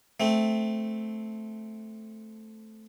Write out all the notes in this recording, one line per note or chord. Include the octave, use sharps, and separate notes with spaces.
A3 C4